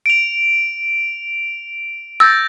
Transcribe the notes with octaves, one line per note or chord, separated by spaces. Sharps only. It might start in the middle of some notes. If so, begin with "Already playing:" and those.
D7 F7
E6 G6 A6 A#6